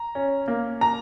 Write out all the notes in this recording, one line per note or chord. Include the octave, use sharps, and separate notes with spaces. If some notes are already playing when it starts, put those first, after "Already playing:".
Already playing: A#5
C#4
A#3
A#5